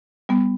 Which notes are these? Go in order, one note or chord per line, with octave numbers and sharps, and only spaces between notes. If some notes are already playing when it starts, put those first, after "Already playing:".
G3 B3